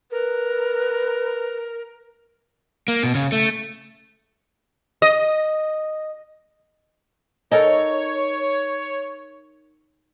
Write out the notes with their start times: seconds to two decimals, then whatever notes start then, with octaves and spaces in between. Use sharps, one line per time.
0.11 A#4 B4
2.88 A#3
3.03 B2
3.15 C#3
3.32 A3
5.02 D#5
7.51 D#4 A4 A#4 C#5